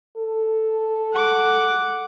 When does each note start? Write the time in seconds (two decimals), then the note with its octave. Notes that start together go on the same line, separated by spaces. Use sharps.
0.17 A4
1.13 F#5 D6